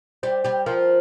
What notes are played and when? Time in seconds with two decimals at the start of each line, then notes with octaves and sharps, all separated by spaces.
0.23 G3 G4 C5
0.44 G3 G4
0.66 F3 F4 A#4